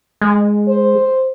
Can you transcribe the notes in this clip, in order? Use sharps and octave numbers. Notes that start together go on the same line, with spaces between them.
G#3
C5